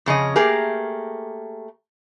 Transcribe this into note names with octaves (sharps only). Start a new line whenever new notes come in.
F2 C#3 C#4 D#5
A3 A#3 G4 G#4 A#4